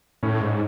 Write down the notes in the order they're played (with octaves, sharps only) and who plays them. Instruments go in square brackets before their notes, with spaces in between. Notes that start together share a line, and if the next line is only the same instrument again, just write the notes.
[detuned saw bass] A2 [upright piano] C#4
[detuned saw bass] G#2